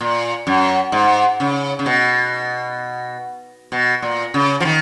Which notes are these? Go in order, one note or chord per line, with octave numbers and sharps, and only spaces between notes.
A#2
F#2
G#2
C#3
C#3
B2
B2
A#2
C#3
F3
D#3